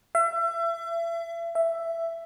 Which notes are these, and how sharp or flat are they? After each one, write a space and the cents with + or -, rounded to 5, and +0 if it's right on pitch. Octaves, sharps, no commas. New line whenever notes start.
E5 +35
E5 +10